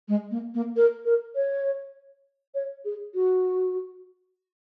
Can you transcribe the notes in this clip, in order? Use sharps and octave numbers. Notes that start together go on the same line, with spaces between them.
G#3
A#3
A#3
A#4
A#4
C#5
C#5
G#4
F#4